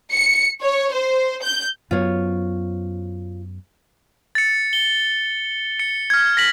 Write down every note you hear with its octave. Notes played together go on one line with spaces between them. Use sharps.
C#7
C#5
C5
G6
F#2 F#3 B3 F4 C5 C#5
A6 C#7
G7
C#7
F6 G#6
A#6 B6 F#7